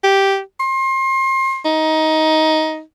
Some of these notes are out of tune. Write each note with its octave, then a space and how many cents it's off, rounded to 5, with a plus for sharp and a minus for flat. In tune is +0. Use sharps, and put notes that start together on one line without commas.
G4 -5
C6 +30
D#4 +15